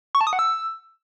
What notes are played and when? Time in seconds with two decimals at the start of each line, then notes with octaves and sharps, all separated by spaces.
0.15 C#6
0.21 A5
0.27 D#6
0.33 F#5
0.39 E6